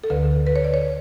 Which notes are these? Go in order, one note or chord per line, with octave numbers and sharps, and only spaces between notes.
A4
D2 D3 B4
B4
C#5
D5
C#5